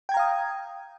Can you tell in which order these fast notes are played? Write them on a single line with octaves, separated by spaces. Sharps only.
G5 G#6 A#5 F5 D#6